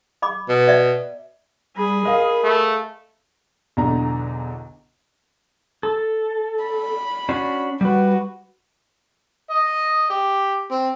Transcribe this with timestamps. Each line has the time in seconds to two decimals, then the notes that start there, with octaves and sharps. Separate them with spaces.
0.22 D#5 B5 D6
0.49 B2
0.68 D5 E5
1.77 G3 G#4 B5
2.05 A#4 D#5 F5
2.43 A3
3.77 B1 E2 D3 D4 A#5
5.83 A4
6.64 B5
7.29 C#4 D4 F#4
7.81 G3 F#4 B4
9.50 D#5
10.10 G4
10.71 C4